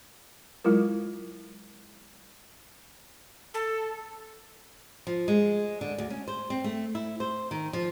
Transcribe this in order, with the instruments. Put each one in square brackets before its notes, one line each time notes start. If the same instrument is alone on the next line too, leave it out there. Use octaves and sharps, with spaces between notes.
[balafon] F#3 G#3 E4 F4 A#4
[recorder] A4
[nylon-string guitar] F3
G#3
D3
D2
C#4
C5
C4
A3
E4
C5
D#3
F3